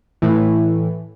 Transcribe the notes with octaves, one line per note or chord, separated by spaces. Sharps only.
A2 E3